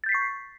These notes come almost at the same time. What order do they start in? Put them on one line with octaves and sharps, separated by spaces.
A6 G6 B6 C7 C#6